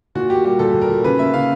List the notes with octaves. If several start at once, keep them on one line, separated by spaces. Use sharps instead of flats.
A#2 F#4
A#3 G4
G3 G4
A#2 A4
A#2
A#4
A#2
C#3 B4
A#3 E5
C#3 F5